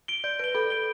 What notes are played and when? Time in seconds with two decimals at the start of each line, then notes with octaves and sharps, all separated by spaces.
0.08 D7 G7
0.24 D5 G6
0.39 B4 D7 G7
0.55 A4 B5
0.70 G6 D7 G7